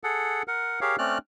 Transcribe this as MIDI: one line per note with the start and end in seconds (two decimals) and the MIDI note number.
0.04 0.43 68
0.04 0.43 69
0.04 0.43 78
0.48 0.80 70
0.48 0.80 78
0.81 0.96 67
0.81 0.96 68
0.81 0.96 70
0.81 0.96 73
0.81 0.96 77
0.98 1.18 57
0.98 1.18 60
0.98 1.18 61
0.98 1.18 74
0.98 1.18 89
0.98 1.18 90